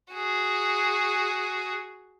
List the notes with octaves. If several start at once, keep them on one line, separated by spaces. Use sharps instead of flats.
F#4 G#4